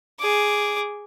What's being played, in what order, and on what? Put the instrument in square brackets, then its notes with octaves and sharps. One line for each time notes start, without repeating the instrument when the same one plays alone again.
[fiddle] G#4 D6